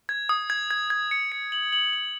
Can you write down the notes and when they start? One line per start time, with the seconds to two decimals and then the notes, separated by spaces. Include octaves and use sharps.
0.09 G#6
0.29 D#6
0.50 G#6
0.71 G#6
0.90 G#6
1.11 C#7
1.32 C#7
1.52 F#7
1.73 F#7
1.93 F#7